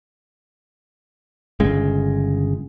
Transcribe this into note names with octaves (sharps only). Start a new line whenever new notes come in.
G1 C#3 G#3